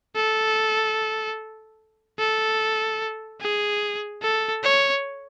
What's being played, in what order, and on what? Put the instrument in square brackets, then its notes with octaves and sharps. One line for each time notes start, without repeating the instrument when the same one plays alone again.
[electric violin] A4
A4
G#4
A4
C#5